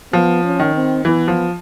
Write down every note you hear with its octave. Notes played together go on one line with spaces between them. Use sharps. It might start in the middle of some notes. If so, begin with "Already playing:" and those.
F3 B3
C#4
D#3
C4
E3 B3
F3